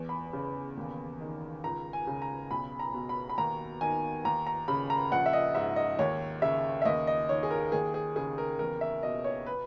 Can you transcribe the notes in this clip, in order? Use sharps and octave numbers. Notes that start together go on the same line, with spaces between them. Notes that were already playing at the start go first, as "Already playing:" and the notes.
Already playing: E2
B5
C#3
D#2
D#3
C#2 A#5
G#5
C#3
A#5
B1 B5
A#5
B2
B5
B5
D#2 A#5
D#3 G#5
D#2 A#5
A#5
C#3 B5
A#5
A#1 F#5
E5
D#5
G#2 E5
D#5
D#2 C#5
C#3 E5
E5
D#2 D#5
D#5
D#3 C#5
G#4
A#4
D#2 G#4
G#4
C#3 G#4
A#4
E2 A#4
E5
B2 D#5
C#5
B4